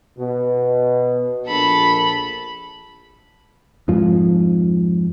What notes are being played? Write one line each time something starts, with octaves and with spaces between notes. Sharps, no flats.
B2
A#1 A4 B5
F2 G#2 F3